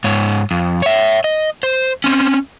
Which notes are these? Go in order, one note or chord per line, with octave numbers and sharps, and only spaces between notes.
G#2 C#5
F2
C#5 E5
D#5
C5
C4 C#4